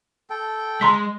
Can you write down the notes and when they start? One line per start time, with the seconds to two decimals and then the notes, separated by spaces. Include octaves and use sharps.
0.30 A4 G5
0.81 G#3 A#5 C6 B6